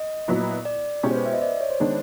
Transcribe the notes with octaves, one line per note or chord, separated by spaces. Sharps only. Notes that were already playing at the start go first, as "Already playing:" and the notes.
Already playing: D#5
A#2 F#3 B3 E4
D5
B2 G#3 C#4 E4 G4
C5
B4
E5
D#5
D5
C#5
C5
D#3 G#3 B3 D4